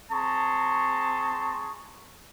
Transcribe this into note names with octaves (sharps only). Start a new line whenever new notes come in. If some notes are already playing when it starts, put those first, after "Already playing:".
C4 G#4 A5 A#5 C6 C#6